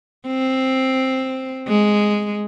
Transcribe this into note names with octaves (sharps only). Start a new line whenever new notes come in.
C4
G#3